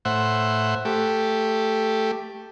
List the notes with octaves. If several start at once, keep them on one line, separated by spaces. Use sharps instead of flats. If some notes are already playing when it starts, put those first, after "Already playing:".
A2 C5 E5 F#5
A3 G4